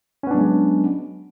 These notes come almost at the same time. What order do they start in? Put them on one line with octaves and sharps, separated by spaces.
C#4 B3 D4 F#3 G#3